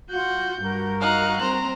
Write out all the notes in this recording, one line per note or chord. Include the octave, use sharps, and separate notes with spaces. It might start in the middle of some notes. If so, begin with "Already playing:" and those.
F4 F#4 G6
G2 F#4 A#4
D#4 F5 F#6
C4 C5 A#5